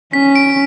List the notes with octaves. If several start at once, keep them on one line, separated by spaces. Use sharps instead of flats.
C#4 B6
D7